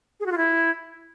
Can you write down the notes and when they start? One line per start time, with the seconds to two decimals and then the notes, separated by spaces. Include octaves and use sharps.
0.20 G#4
0.26 F#4
0.32 F4
0.38 E4